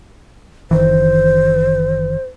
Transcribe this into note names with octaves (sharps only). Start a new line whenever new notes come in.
F#1 D#3 E3 C5